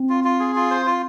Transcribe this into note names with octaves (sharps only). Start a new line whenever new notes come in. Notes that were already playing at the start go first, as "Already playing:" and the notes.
Already playing: C4
F4
F4
G#4
F4
C5
F4